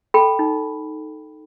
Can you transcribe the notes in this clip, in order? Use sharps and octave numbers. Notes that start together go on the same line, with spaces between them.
A4 G5 B5
D#4